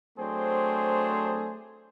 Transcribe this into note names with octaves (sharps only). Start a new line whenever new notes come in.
F#3 A3 C4 D4 G#4 C5